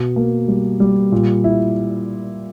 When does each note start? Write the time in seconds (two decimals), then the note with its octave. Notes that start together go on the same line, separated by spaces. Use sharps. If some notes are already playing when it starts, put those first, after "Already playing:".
Already playing: B2
0.16 A#3
0.48 G3
0.80 G3
1.12 A#2
1.44 E4